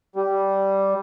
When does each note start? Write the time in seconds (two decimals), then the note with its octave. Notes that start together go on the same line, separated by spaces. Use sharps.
0.16 G3